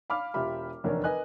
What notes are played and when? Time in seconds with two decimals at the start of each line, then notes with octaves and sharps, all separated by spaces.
0.10 F5 B5 D6 F6
0.34 E1 F4 G4 E5 B5
0.84 F1 E2 D3 A#4 C#5 D5
1.04 A#4 B4 D#5 G#5 F#6